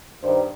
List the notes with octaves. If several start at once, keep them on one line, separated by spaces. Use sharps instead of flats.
G2 D#3 C5